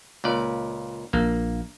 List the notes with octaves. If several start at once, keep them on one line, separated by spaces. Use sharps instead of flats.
C#2 A#2 D5
A#1 A#3